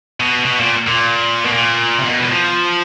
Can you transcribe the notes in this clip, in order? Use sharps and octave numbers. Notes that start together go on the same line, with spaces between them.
B2
B2
A#2
A#2
B2
A#2
C3
B2
E3
F3